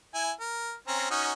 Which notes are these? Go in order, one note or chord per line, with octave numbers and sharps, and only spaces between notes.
E4 G#5
A#4
C4 C#4 A#5
C#4 D#4 F#4